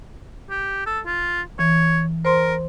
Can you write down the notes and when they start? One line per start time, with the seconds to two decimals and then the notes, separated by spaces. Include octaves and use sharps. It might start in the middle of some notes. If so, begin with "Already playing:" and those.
0.50 G4
0.86 A4
1.06 F4
1.59 E3 C#5
2.25 A#4 C5 C6